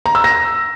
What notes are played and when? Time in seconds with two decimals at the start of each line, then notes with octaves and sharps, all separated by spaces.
0.06 A#5
0.15 E6
0.24 A#6